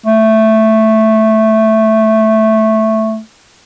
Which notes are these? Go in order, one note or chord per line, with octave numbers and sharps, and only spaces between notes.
A3